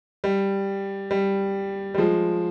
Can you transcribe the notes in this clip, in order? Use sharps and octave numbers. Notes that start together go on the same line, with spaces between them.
G3
G3
G3
F3 G#3